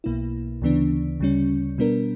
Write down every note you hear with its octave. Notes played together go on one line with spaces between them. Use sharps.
B1 B2 A#3 E4
D2 C#3 E3 B3 D4
D2 C#3 G3 C#4
B2 G3 B3 D4 A#4